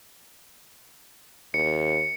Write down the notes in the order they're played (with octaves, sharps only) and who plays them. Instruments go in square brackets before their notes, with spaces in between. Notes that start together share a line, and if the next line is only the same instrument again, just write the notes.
[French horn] D#2 [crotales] C#7